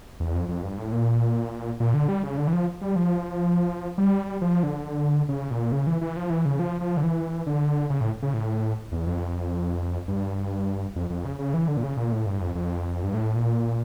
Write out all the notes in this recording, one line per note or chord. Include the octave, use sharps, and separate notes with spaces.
E2
F2
F2
G2
A2
A#2
A#2
D3
G3
C#3
D3
E3
F3
G3
F3
G3
F3
D3
C#3
A#2
C#3
E3
E3
F3
E3
C#3
F3
F3
D3
E3
D3
C#3
A2
C#3
A2
E2
F2
G2
F2
F2
C#3
C#3
E3
D3
A#2
C#3
A#2
A2
G2
F2
F2
G2
A2
A#2